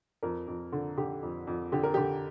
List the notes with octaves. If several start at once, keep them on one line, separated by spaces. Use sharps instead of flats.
F2 A#4
F2
D3
D3 G4
F2
F2
D3 G4
A#4
D3 G4